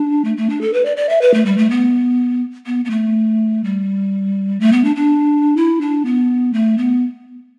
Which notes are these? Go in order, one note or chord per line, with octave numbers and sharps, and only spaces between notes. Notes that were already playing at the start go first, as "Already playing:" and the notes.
Already playing: D4
A3
A3
D4
A4
B4
D5
D5
E5
B4
A3
G3
A3
B3
B3
B3
A3
G3
A3
B3
D4
D4
E4
D4
B3
A3
B3